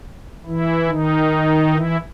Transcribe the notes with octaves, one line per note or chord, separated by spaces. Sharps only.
E3 E4
D#3 D#4
E3 E4